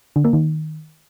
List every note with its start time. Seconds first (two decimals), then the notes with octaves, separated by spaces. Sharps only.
0.16 D3
0.24 A#3
0.33 D#3